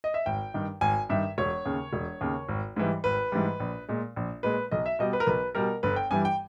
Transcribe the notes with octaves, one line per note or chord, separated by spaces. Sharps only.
D#5
E5
G#1 G5
G2 D#3
G#1 G#5
G2 D#3 E5
E1 C#5
D#2 C#3
E1
D#2 C#3
G#1
G#2 E3 G3
G#1 B4
G#2 E3 G3
A#1
A#2 G#3
A#1
A#2 G#3 B4
B1 D#5
E5
B2 G3 D#5
B4
A#4
B1 B4
B2 G3 A#4
G1 B4
G5
G2 E3 G3 G#5
G5